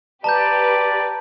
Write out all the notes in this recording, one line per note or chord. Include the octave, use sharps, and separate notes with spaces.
G4 B4 D5 A5 A#5 G6